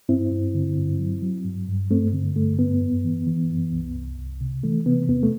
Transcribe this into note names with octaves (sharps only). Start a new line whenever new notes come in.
G2 C4 E4
G2
D3
G2
F#3
F#3
G2
G2
G2 A3 C4
D3
G2 A3
G2 B3
F#2
E3
E3
F#2
C2
C2
C2
C3
E3 A3
C3 B3
E2 B3
A3